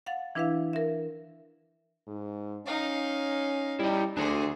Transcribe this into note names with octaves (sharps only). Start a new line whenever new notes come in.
F5 F#5 A6
E3 D4 E4 B4 E5 F5
A#4 E5
G#2
C#4 D#4 F5
G3 E4 D#5
D2 D4 F#4 G#4 A4 C5